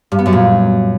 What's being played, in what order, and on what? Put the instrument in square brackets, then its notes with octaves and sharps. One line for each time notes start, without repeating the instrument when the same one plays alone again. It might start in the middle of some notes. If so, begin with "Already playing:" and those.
[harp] G2
B3
F#2
A#2